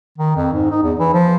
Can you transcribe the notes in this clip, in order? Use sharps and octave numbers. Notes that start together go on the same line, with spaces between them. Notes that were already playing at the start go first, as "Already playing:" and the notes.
D#3
F2
G#2
D#4
E2
E3
F3